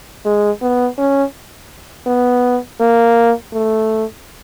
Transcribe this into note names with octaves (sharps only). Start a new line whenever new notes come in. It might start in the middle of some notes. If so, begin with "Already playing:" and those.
G#3
B3
C#4
B3
A#3
A3